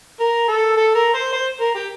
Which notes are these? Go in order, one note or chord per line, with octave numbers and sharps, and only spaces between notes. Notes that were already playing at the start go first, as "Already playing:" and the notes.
A#4
A4
A4
A#4
C5
C5
A#4
G4